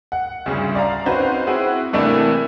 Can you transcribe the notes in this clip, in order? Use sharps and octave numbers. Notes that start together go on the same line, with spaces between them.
F#5
D2 G2 C#3
D5 F5 A#5
C4 C#4 D#4 F#4 B4 C5
C4 E4 F#4 G#4
C3 E3 A3 A#3 D4 E4